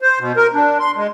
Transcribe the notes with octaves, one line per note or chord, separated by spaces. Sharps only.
C5
B2
A#4
D4
C6
G#3